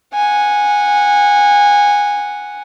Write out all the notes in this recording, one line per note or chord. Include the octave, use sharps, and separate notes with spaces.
F#5 G#5